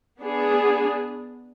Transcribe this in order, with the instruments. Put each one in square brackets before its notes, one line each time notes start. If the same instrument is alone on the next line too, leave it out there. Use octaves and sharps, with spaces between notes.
[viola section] B3 D4 G#4